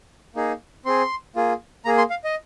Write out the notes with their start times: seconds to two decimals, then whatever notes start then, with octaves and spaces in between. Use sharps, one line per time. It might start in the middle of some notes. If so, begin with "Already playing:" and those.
0.35 A#3 D#4 G#4
0.85 C4 G#4 C6
1.36 A#3 F4 G#4
1.85 A#3 G#4 A#5
1.98 C6
2.10 F5
2.24 D#5